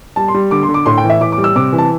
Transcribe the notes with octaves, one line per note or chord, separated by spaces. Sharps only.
G3 A5
C6
G3
D3 D6
C6
D3
D6
A2 C6
G5
E3
E5
A2 D6
D6
G3
E6
C3 D6
E3
A5